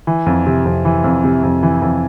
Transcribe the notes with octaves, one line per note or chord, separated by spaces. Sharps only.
E3
F2
C3
F2
E3
F2
C3
F2
E3
F2